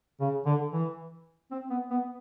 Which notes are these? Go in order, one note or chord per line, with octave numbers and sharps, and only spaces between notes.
C#3
D3
E3
C4
B3
B3